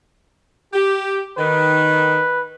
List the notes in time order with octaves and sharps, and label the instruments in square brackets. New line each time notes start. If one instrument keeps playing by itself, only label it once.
[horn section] G4
[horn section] D#3 [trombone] B4